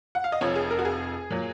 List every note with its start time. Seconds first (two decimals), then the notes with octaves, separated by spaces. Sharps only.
0.15 F#5
0.24 F5
0.32 D#5
0.41 F1 F2 F3 C#5
0.56 G#4
0.70 A#4
0.79 F#4
0.85 G#4
1.30 A#2 F#3